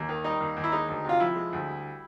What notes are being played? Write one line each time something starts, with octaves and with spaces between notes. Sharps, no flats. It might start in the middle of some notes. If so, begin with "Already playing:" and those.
Already playing: D#2
D#3
G3 D#4
D#2
D#2
E4
G#3 D#4
D2
C3 F4
F3 E4
G#3
D2
G3